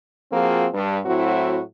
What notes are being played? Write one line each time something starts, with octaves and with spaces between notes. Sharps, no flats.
F3 A#3 C4 F4 F#4 G#4
G2
A2 F#3 C4 E4 F#4